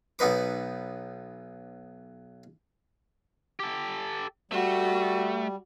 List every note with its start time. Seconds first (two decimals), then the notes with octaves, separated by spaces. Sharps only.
0.19 B1 B3 D#4 B4 D6
3.60 G4 A4
4.52 G3 A3 F#4